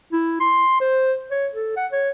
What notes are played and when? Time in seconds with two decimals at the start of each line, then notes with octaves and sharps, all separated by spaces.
0.12 E4
0.40 C6
0.80 C5
1.31 C#5
1.53 A4
1.77 F#5
1.92 C#5